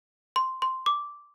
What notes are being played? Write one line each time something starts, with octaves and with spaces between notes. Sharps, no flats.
C6
C6
D6